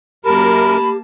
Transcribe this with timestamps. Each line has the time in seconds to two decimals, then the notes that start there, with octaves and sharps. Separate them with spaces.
0.25 F#2 A#3 G4 A#4 A5 B5